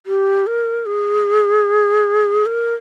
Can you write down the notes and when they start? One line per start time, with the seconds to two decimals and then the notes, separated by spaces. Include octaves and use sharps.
0.06 G4
0.47 A#4
0.86 G#4
2.46 A#4